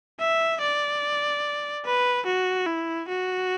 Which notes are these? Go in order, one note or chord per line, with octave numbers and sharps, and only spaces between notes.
E5
D5
B4
F#4
E4
F#4